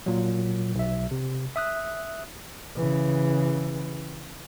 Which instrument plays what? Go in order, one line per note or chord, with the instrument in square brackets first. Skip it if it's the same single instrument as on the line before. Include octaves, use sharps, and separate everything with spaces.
[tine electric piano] A#2 F#3
B1 E5
C3
E5 D#6 F#6
[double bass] C#3 E3